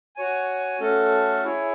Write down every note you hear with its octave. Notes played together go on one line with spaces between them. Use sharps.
F#4 C#5 G#5
A3 C#4 F#4 A4
E4 G#4 C#5